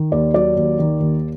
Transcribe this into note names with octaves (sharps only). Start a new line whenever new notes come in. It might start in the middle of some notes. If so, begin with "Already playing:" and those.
Already playing: D#3
D#2 D5
F#3 D5
D#2
D#3
D#2